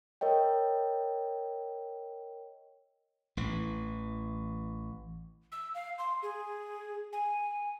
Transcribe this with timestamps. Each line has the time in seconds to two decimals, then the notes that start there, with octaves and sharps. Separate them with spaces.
0.21 A#4 C#5 D#5 G5
3.37 A1 E3
5.52 E6
5.75 F5
5.99 C6
6.23 G#4
7.13 G#5